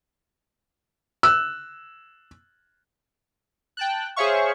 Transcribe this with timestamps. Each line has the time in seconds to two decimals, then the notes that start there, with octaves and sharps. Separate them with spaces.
1.23 E6 F#6
3.77 G5 A5 F#6
4.16 G#4 C5 C#5 E5 F5 C#6